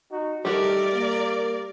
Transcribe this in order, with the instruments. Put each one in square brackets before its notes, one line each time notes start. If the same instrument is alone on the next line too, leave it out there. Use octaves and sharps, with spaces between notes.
[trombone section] D#4 F#4
[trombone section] D#3 A3 [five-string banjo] G3 F#4 [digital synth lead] G4 [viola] A#4 D5
[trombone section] A#3